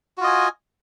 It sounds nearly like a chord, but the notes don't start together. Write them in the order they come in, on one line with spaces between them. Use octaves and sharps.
F#4 F4 D#5 G#5